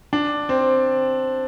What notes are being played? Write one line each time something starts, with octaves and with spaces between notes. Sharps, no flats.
D4
C4